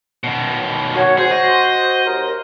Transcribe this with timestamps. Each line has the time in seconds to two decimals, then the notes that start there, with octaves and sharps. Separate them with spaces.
0.24 B2 D#3
0.95 F#4 C#5
1.18 F#4 G#4 C5
1.31 D#5
2.05 D#2 A#4